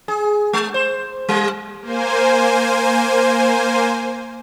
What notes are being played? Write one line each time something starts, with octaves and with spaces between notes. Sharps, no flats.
G#4
G#3
C5
G3
A#3 C5 G#5